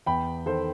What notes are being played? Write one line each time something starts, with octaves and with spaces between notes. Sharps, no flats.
E2 G5 B5
D#3 A4 C5